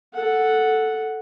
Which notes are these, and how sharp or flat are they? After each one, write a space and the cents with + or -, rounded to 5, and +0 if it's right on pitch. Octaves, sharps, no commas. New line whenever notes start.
A4 +0 F#5 +0